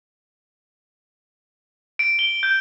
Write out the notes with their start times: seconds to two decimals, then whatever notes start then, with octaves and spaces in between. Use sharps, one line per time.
1.99 D7
2.19 G7
2.43 G6